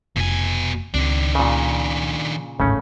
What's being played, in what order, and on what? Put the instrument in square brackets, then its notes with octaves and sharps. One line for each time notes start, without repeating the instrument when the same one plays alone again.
[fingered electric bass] F1 [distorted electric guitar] B2 G#5
[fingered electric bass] C#2 C4 [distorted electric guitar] D#3 D4
[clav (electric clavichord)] A#2 C#3
[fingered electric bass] D1 G#1 G#2 [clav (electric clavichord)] C#3 A3 C#4